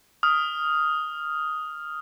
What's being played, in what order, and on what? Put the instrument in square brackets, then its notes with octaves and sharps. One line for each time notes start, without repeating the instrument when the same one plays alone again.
[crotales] D#6 F6